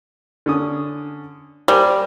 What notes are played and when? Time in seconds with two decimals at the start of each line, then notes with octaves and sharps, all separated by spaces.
0.46 D3 C#4 D#6
1.68 G3 A#4 C5 G#5